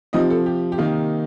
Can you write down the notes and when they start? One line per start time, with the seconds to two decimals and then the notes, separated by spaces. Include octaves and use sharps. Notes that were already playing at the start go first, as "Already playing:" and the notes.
0.13 C3 F3 C4 D#4 D#5
0.30 A4
0.46 G4
0.72 G4
0.78 C3 D#3 A#3 D#4